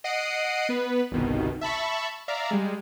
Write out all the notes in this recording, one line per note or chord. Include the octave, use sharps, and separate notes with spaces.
D#5 F#5 C7 D7 D#7
B3 B4
G1 C2 B2 D#3
E5 A5 B5 C#6
D5 E5 F5 A#5
G3 G#3